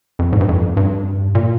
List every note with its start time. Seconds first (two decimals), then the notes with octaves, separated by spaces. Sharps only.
0.19 F2
0.33 G#2
0.41 G2
0.49 F2
0.77 G2
1.35 A#2